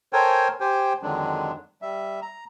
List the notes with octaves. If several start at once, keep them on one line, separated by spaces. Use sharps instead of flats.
A4 A#4 C5 C#5 G5 G#5
G4 C5 G5 G#5
F2 D3 D#3 F#3 G#3 D4
G3 E5
A#5